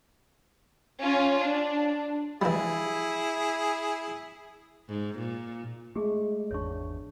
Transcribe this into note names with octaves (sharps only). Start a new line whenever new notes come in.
C#4 F4
D4
E3 G3 E4 G#4
G#2
A#2
G#3 A3 G4 G#4
G#1 E2 D4 C#5 C#6